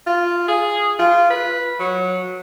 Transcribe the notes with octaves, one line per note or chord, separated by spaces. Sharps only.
F4
G#4
F4
B4
F#3